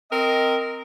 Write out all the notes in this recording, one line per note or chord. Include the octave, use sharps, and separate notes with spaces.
C4 A#4 D#5